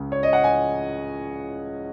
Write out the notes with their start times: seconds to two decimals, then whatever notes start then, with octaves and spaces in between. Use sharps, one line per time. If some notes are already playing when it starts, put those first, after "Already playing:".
Already playing: C#2 C#3
0.12 C#5
0.23 D#5
0.33 F#5
0.44 G#5